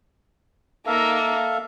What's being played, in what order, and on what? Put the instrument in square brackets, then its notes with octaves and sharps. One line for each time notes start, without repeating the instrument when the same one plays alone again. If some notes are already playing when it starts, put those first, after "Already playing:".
[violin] A#3 D#4 [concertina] A4 E5 F5